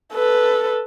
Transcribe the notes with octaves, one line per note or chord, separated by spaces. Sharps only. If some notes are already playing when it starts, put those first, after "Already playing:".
A4 B4